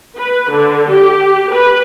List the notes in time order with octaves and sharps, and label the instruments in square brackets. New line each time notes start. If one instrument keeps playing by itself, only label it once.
[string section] B4
D3
G4
B4